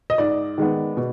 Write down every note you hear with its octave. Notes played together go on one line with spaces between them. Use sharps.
D#5
G#2 D5
D#3 G#3 B3
B2